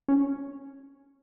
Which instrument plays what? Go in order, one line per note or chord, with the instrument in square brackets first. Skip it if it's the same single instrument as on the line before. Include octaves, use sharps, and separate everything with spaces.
[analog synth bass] C#4